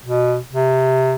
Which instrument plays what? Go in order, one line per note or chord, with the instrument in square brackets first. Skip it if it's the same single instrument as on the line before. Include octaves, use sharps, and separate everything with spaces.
[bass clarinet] B2
C3